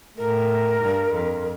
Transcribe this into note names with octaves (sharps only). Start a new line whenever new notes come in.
A2 A#4
G2
F2